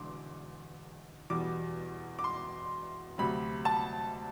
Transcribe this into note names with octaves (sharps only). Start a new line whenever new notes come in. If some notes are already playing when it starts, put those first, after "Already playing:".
Already playing: E1 E2 D3 C6 D6
E2 B2 G3 D6
D6
C6
D2 C3 F#3 B5
A5